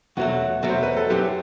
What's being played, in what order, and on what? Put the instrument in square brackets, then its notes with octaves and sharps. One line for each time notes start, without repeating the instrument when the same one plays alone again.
[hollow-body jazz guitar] E2 B2 F#3 A3 [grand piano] F#4
[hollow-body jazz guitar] E2 B2 F#3 A3
[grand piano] C5
B4
A4
[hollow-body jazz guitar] F#2 F#3 C4 E4 [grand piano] G4